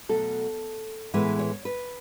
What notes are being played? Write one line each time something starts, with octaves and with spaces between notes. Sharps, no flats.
B2 F#3 A3 A4
A2 E3 G#3 B3 B4
C#5
B4